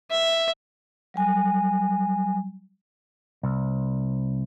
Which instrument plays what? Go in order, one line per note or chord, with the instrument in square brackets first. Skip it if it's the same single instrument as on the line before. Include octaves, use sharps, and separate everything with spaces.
[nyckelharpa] E5
[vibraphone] F#3 G3 G#5
[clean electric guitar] C2